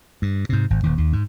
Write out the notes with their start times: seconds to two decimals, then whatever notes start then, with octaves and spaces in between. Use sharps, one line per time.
0.22 G2
0.49 G#2 C3
0.70 G#1
0.83 D#1 D#2
0.98 D#2
1.13 G#2